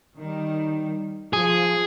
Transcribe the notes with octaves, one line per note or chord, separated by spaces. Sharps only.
D#3 G3
F3 G#4